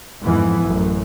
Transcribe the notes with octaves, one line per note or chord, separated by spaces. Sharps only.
F2 G#2 E3 B3
A1 F#2